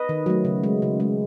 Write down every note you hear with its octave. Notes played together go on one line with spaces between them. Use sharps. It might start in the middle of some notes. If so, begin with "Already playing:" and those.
Already playing: B4 D#5
D#3
F#3 A3
C#3
G#3
C#3
G#3